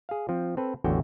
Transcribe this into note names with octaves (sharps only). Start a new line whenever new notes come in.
G#4 F5
F3 C4
C4 A4 B4
A1 E2 D3 F#4 C#5 G5